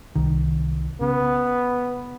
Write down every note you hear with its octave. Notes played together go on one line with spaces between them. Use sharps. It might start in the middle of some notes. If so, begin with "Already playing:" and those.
C2 D#3
C#3 B3